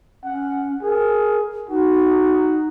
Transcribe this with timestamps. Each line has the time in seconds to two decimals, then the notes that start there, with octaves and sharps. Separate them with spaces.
0.23 C#4 F#5
0.83 G#4 A#4
1.69 D#4 F#4